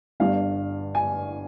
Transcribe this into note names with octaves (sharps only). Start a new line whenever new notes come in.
G1 G2 D3 F5
G#5